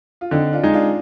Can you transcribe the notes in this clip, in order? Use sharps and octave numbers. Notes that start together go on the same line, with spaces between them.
F4
D3 C4 D#4
D4 F4
G#3 D#4
D4 F4